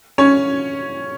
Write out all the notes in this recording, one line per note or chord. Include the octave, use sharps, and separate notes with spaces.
C#4 C#5